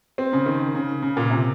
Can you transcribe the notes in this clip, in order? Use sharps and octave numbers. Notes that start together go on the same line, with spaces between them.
C4
C#3
D#3
C#3
C#3
A#2
C3